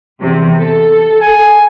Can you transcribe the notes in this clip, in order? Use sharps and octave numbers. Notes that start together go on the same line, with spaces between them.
E2 C3
A4
G#5